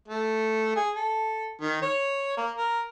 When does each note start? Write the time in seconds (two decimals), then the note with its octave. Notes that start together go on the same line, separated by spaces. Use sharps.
0.08 A3
0.76 G#4
0.96 A4
1.61 D#3
1.82 C#5
2.37 A#3
2.58 A#4